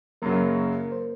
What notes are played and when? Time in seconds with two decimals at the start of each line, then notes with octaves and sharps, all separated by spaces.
0.22 F#2 C#3 F#3 A#3 A#4
0.92 C5